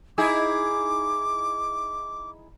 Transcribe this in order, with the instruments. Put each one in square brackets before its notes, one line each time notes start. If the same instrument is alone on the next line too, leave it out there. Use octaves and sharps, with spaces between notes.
[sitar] D#4 E4 G#4 [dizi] D6